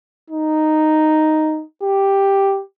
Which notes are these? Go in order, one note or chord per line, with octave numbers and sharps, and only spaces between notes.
D#4
G4